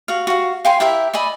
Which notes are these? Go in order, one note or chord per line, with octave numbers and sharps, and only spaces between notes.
F#4 F5
F#4 F5
F5 G5 G#5 C6
E4 G4 A#4 E5
D5 D#5 G#5 B5